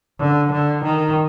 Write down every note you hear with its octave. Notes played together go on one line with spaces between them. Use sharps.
D3
D3
D#3